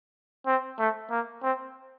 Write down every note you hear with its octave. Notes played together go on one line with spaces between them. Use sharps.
C4
A3
A#3
C4